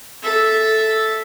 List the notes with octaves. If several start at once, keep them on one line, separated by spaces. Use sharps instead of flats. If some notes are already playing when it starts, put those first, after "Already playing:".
A4 E5